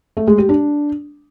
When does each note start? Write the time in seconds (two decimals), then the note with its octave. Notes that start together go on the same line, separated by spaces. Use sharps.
0.17 A3
0.27 G#3
0.38 G4
0.49 D4